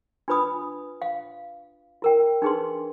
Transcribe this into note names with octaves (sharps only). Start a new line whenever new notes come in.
D4 F4 B4 B5 D#6
F5
E4 A#4 G5
D4 D#4 G#4 B4 C6